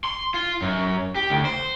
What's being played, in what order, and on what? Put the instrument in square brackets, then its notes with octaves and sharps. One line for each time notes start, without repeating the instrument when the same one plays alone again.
[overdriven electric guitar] C6
F4
F#2
G4
D2
C5